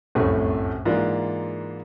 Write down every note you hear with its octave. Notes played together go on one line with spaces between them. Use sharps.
F1 C2 F#2 A2 C3 A3
G#2 E3 A#3 D4 F4